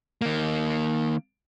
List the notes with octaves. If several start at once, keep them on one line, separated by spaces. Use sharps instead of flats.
D#3 A#3